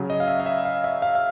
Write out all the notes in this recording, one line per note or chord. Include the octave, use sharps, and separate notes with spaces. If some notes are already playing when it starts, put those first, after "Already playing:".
Already playing: C#3 F#3
D#5
F5
E5
F5
E5
F5
E5
F5
F5